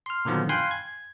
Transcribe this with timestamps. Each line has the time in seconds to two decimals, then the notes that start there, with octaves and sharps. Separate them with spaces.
0.06 C6 F6
0.25 A#2 D3 D#3 F3 F#3 B3
0.49 F5 G5 G#5 B5 C6 F#6
0.71 G#6